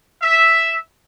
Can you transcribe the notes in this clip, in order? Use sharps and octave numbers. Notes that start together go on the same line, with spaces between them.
E5